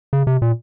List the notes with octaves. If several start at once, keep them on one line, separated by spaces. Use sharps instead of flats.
C#3
C3
A#2